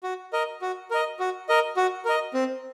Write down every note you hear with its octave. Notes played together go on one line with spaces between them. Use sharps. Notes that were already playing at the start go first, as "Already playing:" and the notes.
F#4
A#4 D#5
F#4
A#4 D#5
F#4
A#4 D#5
F#4
A#4 D#5
C4